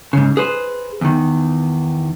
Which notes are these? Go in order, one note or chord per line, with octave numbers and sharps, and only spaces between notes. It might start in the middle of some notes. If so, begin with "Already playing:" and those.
G#2 C#3
G#4 B4 C5
E2 D#3